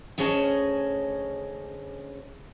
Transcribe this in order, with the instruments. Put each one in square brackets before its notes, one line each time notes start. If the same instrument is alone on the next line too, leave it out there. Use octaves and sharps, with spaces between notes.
[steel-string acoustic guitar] D2 C#4 G#4 C#5 D#5 A5